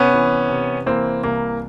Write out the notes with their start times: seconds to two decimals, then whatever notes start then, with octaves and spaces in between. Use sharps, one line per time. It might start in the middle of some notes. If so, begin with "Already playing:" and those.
Already playing: C3 B3 C#4
0.14 E3
0.49 C3
0.86 E3 A#3 C4
1.23 C2 A#3